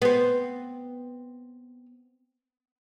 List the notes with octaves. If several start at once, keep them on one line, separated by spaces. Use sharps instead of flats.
B3 C4